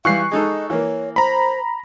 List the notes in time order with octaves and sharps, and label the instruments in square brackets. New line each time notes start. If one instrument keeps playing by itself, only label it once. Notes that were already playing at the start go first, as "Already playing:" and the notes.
[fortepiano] E3 G3 [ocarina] F5 [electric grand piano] C#6 F#6 C7
[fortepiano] G#3 D#4 A4 [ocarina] D#5
[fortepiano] E3 A#3 [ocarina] C#5
[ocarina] C5 [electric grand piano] A#5 B5